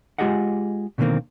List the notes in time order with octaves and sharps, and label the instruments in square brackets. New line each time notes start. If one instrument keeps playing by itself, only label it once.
[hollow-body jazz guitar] G#3 F4 G4 G#4 D#5 F#5
B2 D3 D#3 G3 A#3 C4